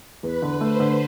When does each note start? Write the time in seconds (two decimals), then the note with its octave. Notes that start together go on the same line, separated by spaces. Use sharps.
0.23 E2 B4
0.42 D3
0.61 A3 C5
0.80 D3